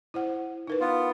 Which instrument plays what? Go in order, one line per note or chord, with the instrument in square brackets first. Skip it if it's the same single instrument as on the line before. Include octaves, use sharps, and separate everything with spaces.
[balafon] E4 C5 F#5
D#4 A#4 B4
[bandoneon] B3 F4